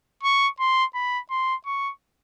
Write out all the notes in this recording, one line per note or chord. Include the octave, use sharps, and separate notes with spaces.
C#6
C6
B5
C6
C#6